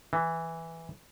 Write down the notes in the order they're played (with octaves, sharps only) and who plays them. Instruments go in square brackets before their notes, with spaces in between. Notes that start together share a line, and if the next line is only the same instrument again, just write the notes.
[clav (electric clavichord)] E3